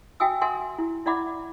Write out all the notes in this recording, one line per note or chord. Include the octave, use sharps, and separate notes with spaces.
F#4 E5 G5 G#5 D#6 E6
A#4 E5 F#5 G#5 C6
E4
E4 D5 E5 F#5 B5 D6